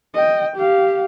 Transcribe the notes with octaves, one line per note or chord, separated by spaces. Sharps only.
D#5 G5
G4 F5